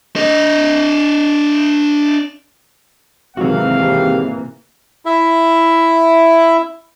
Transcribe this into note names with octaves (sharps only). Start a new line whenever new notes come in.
D4 D#5
G#1 C3 E3 F#3 A#3 F#4 F5
G4
E4 E5